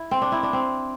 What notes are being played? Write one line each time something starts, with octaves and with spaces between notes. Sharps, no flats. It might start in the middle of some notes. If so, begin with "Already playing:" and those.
Already playing: E4
C4
D4
E4
D4
C4